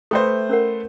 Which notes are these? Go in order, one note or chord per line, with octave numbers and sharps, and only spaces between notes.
A3 B4 C5 E5 G5 D#6
C#4 A#4 F#5